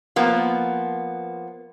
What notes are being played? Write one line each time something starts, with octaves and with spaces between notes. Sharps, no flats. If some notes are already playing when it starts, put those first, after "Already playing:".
F3 A#3 B3